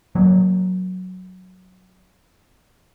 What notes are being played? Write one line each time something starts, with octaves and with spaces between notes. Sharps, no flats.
F#3 A#3